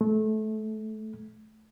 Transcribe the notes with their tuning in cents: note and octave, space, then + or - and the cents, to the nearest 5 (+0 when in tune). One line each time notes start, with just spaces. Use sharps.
A3 -20